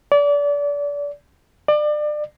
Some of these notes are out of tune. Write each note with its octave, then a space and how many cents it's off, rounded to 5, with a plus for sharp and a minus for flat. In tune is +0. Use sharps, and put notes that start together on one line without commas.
D5 -30
D5 +30